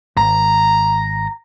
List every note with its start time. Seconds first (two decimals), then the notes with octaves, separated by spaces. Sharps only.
0.17 G#1 A#5